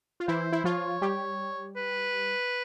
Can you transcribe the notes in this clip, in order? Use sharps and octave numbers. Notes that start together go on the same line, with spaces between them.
F4
E3 E4 C5
E4
F3 F4 C#5
G3 G4
B4